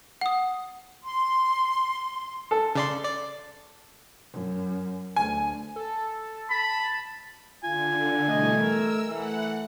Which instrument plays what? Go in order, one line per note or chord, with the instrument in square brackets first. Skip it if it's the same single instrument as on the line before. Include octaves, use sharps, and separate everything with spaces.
[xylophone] F#5 D#6
[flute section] C6
[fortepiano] A4
[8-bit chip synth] C#3 D5 C6
D5
[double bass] F#2
[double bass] D2 [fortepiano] G#5
[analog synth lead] A4
[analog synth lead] A5 [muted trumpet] B5
[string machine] D3 [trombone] F4 [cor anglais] G#5
[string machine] B2 E3 G3 [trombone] A3 [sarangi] D#5
[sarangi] A#4 [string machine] E6
[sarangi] E3 [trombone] A3 [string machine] F#5